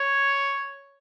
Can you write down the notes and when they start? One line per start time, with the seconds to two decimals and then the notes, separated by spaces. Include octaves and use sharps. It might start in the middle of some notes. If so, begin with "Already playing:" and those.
Already playing: C#5